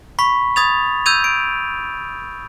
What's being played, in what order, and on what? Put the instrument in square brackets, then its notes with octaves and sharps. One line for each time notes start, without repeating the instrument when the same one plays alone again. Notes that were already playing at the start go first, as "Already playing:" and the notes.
[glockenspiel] B5 C#6 B6
B5 D#6 G#6 A6 F7
E6 G6 G#6 D#7 F7
D7